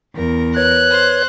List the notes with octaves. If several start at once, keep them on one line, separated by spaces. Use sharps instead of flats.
E2 A#4
B4 C#5 F#6 G#6
C5